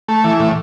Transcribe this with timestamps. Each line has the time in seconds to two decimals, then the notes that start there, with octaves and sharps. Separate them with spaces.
0.08 A3
0.24 E3
0.40 A2